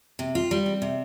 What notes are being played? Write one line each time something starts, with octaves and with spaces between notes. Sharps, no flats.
C3
F4
G3
C4
C3